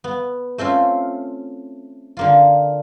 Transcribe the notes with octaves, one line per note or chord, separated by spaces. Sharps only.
B3
A3 C4 C#4 F4
D3 A#3 F4